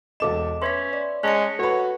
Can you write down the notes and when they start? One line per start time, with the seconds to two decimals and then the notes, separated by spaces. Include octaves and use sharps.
0.20 E1 A4 D#5 D6 E7
0.62 C#4 B4 E5 C6 G#6 B6
0.93 D5
1.23 G#3 C#4 A5 F#6 A#6 C#7
1.59 F#4 A4 B4 C#5